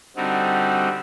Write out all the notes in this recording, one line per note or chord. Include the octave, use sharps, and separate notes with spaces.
D3 G3 C4 D#4 F#4